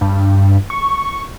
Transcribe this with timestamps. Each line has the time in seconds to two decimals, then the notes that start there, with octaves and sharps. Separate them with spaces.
0.01 G2
0.70 C#6